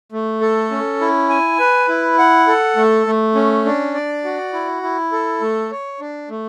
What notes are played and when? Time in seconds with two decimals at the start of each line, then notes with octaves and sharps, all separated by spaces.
0.12 A3
0.41 A4
0.71 C#4
1.01 E4
1.29 G#5
1.59 B4
1.89 E4
2.18 F#5
2.47 A4
2.76 A3
3.07 A3
3.35 C#4
3.65 D4
3.94 D5
4.24 F#4
4.53 E4
4.83 E4
5.12 A4
5.41 A3
5.71 C#5
6.00 D4
6.30 A3